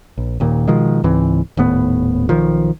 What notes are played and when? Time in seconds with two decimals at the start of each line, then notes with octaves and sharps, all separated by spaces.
0.18 A#1
0.40 D#1 D#2 A#2
0.68 B2 D#3 F3 G#3
1.04 C#2 G#2 E3 C4
1.57 D#1 D#2 A2 B3
2.29 B1 D#3 F3